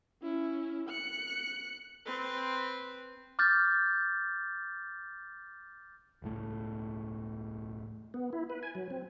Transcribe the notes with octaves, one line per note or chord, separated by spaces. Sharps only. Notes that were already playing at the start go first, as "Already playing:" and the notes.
C#4 E4
F#6 C#7
C4 B4
D6 F6 G6 A6
E1 C#2 A2 A3
B3
E4
B4
G#5
F#3
C4